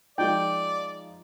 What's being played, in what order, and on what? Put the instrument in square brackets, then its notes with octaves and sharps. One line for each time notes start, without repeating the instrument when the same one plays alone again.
[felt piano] F3 G#3 D#4 [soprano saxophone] D5 [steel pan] G5